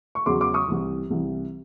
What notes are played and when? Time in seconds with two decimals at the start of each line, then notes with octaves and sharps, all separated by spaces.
0.15 C#6
0.26 E2 C#3 F#3 C6 D6
0.41 C6 D6
0.54 C#6 D#6
0.68 C2 C3 E3
1.10 C2 C3 E3